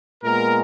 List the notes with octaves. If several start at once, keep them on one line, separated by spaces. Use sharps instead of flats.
A#2 G#3 B3 A#4